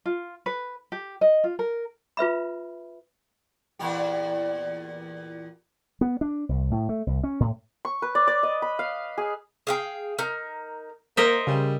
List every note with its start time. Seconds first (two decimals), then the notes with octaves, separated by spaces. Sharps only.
0.06 F4
0.46 B4
0.92 G4
1.21 D#5
1.44 F4
1.59 A#4
2.17 F4 B4 E5 B5
3.79 E2 A#2 G4
6.01 B3
6.21 D4
6.49 C2
6.71 A2
6.89 A3
7.07 C2
7.24 C#4
7.40 A2
7.85 C#6
8.02 B4
8.15 D5
8.27 D5
8.43 D#5
8.62 B5
8.79 F5
9.18 G#4
9.67 G#4 F5 G5
10.19 D#4 A#4
11.17 A#3 A#4 C5 D#5 E5
11.47 C#3 G3